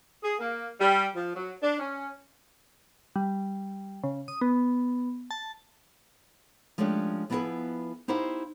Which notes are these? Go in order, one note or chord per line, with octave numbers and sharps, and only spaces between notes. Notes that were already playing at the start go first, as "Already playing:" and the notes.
G#4
A#3
G3
F3
F#3
D4
C#4
G3
C#3
D#6
B3
A5
F3 G#3 A3 C#4 D4 G4
F3 B3 E4 F4 G#4 B4
D#4 E4 G4 C5 D#5 F5